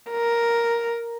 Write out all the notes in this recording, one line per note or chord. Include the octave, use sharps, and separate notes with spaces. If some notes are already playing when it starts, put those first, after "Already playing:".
A#4